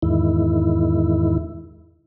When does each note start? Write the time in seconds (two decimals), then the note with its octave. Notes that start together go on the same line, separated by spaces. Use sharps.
0.02 E2 G#2 D#3 E4